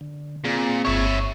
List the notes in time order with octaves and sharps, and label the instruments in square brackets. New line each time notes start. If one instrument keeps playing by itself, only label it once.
[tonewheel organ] D3
[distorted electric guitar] A#2 [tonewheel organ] C4 G#4
[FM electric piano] G1 C#6 [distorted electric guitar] C#5 E5